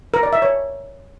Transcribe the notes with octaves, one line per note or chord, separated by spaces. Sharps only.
A#4
D5
E5
C#5